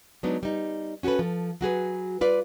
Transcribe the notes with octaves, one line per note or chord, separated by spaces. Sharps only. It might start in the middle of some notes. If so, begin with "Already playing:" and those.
F#3 G#3 B3 D4 D#4
G3 D#4
C#4 F#4 G4 A4 B4
F3 A4
F#3 F#4 G#4 B4
G3 F4 B4 D5